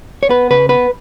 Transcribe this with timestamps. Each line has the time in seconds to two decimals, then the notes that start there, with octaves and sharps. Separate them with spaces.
0.23 C#5
0.29 B3 B4
0.50 C#3 B4
0.69 B3 B4